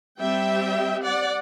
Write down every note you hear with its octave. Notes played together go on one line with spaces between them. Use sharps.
G3 C4 E5 G5
D5 F#5